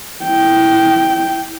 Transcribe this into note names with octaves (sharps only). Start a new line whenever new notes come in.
E4 G5